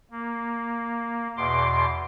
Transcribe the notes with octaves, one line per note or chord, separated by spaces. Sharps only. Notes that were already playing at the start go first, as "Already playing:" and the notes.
A#3
E2 B2 C6 D6